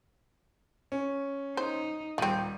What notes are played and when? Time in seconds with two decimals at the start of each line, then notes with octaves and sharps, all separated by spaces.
0.92 C#4
1.57 D#4 C5
2.18 D#1 F3 G3 C4 D#7